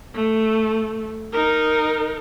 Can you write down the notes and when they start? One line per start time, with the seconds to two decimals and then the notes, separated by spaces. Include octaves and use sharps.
0.15 A3
1.33 D#4 A#4